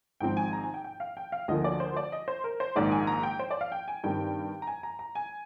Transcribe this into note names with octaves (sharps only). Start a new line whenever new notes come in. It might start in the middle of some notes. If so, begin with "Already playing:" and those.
G#1 G#2 F3 C4 G5
G#5
A#5
G#5
G5
G5
F5
G5
F5
D2 D3 F3 A#3 D#5
D5
C5
D5
D#5
C5
A#4
C5
A#1 G#2 D#3 D5
G#5
A#5
G5
C5
D5
F5
G5
G#5
G2 D#3 G3 C4 G5
A#5
G#5
A#5
A#5
G#5